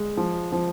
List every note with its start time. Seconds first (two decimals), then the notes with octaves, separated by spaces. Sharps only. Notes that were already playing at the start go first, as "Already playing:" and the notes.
Already playing: G#3
0.17 F3
0.52 F3